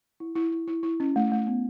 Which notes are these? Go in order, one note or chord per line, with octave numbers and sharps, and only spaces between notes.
E4
E4
E4
E4
E4
C#4
A3
A3
B3